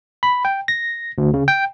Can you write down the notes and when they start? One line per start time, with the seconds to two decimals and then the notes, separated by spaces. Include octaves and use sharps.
0.23 B5
0.45 G5
0.68 A#6
1.18 D2
1.34 C#3
1.48 G5